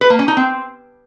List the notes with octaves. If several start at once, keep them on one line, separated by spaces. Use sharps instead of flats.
B4
A#3
C#4
D#4
C4